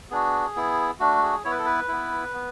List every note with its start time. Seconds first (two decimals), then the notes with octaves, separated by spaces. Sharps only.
0.11 B3 D4 F#4 G#4
0.56 B3 E4
1.00 A3 D4 F#4
1.23 G#4
1.44 B3 E4 C#5
1.51 B4
1.59 A4
1.65 B4
1.88 B3 E4
2.34 B3